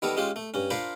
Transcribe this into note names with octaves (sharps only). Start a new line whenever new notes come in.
D#3 G3 B3 A4 A#4
G#3 C#4 F4 G4
A3
G2 C#4
D4 F4 A#4 C5 B5